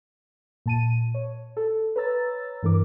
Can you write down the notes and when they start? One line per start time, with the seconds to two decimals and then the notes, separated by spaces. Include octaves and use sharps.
0.66 A#2 A5 D#7
1.14 C#5
1.57 A4
1.96 B4 C#5 A#5 E6 A6
2.63 G2 E3 A#4 D6